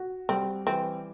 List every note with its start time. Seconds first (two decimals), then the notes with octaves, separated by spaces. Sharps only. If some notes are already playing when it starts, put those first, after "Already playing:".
Already playing: F#4
0.29 G3 C4
0.67 E3 C4